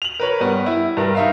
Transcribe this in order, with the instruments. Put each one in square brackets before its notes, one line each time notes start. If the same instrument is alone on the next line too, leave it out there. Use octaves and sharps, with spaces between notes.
[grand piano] F7 F#7
A#4 B4 C#5
G2 B3
E4
G2 A#4 B4
D#4 E5 F5